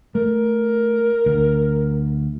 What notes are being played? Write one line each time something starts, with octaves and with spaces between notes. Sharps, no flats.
A3 A#4
D2